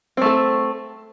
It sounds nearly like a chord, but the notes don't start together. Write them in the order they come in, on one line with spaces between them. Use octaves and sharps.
C4 A3 A4